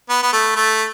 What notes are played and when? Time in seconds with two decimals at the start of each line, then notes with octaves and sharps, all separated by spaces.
0.10 B3
0.23 B3
0.33 A3
0.56 A3